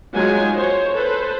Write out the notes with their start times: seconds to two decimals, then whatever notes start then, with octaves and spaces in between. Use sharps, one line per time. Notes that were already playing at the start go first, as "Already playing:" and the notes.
0.14 F#3 G#3 D#4 F4 G#5
0.54 C5 C#5
0.94 A4 B4 C5